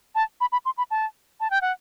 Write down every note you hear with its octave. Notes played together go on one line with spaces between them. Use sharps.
A5
B5
B5
C6
B5
A5
A5
G5
F#5